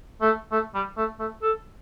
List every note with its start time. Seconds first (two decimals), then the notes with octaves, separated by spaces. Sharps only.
0.21 A3
0.51 A3
0.74 G3
0.97 A3
1.19 A3
1.42 A4